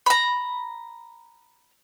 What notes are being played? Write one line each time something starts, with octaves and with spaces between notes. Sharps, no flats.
A#5 B5